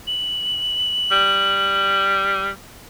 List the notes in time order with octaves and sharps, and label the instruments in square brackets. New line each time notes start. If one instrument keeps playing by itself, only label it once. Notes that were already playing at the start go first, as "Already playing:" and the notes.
[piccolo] F#7
[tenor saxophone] G3